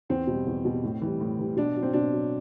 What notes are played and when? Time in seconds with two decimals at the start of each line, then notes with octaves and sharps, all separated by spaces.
0.09 E2 C4
0.27 B2 G3
0.46 E2
0.65 B2 G3
0.83 A2
1.01 E3 G3
1.21 A2
1.39 E3 G3
1.56 B2 D4
1.76 F#3
1.83 C4
1.93 B2 D4
2.12 F#3